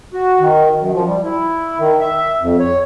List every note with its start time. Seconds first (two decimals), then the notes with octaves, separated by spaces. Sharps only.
0.14 F#4
0.40 D#3
0.78 F#2
0.94 F3
1.07 G3
1.24 E4
1.79 D#3
2.00 E5
2.41 F2
2.59 C#5